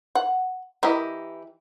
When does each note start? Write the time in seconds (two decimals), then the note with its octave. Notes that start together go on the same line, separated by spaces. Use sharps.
0.15 F#5
0.83 E3 E4 G4 A#4 D#5